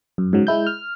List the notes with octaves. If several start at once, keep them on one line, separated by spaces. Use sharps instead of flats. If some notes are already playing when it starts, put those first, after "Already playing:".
F#2
G#2 C#3 F#3
G#3 E4 G6
F6